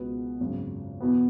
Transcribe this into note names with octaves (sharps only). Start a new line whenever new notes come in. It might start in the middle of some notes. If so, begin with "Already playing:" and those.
Already playing: C#2 B2 G#3 B3 F#4
G#1 F#2 C#3
E2 B2 B3